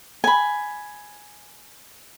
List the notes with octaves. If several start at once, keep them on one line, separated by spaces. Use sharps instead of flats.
G#5 B5